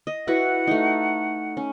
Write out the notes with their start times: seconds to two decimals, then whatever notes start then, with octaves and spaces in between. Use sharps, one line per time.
0.07 D#5
0.27 E4 F#4 B4 F#5
0.67 A3 D#4
1.57 C#4